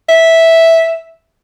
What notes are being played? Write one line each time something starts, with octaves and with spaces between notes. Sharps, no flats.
E5